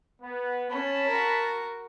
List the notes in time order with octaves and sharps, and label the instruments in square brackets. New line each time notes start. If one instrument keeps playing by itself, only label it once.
[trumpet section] B3
[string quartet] C#4 [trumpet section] A5 B5
[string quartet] F#4 A#4